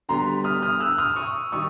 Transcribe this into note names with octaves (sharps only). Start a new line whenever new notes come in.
D3 G3 B3 A#5 C6
D#6 F6
D#6 F6
E6 F#6
D#6 F6
C#6 D#6
D#3 G3 C#6 D#6